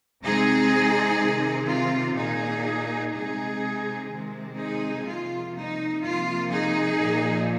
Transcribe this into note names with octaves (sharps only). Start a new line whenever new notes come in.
C3 G#3 C4 D#4 G#4
C3 D#3 C4
F4
A#2 A#3 D#4 G#4
C3 G#3 C4 D#4 G#4
C3 D#3 G#3 C4
D#4 G#4
C3 F3 A#3 F4
D#4
C3 F3 A#3 F4
D#4 G#4
A#2 F3 A#3